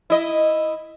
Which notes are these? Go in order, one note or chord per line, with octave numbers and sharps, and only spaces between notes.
E4 D#5